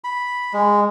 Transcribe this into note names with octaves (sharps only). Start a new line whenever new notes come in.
B5
G#3